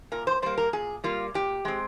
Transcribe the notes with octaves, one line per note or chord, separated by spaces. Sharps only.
A#2 A#4
C5
G3 A#3 C5
A#4
A#2 G#4
G3 A#3 F4
A#2 G4
G#3 C4